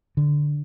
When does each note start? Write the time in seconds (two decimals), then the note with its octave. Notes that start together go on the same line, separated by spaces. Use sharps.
0.17 D3